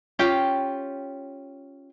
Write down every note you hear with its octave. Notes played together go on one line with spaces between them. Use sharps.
C#4 F4 G4 G5